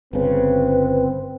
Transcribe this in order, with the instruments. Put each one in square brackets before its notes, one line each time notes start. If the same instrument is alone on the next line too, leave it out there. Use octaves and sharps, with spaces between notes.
[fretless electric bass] G1 C#3 [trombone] C4 [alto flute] B4